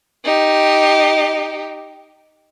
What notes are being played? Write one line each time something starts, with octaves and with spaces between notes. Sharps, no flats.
D#4 G4